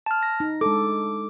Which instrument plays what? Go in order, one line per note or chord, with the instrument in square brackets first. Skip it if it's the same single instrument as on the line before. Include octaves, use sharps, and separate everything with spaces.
[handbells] A5 F6
A#6
[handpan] D#4
[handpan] G#3 D4 A4 [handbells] D6